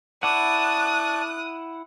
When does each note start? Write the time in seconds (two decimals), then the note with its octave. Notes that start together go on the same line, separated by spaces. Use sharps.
0.23 E4 D5 F#5 A5 C#6 D#6 F#6